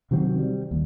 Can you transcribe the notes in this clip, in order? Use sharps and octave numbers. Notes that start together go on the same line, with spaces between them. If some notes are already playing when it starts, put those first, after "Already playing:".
C3 D#3 F#3 C4
G3
D#2